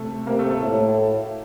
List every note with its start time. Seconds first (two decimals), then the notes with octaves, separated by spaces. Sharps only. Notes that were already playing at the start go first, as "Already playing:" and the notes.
Already playing: C3 A3 A4
0.27 C3 A#3 A#4
0.39 A3 A4
0.51 A3 A4
0.62 A2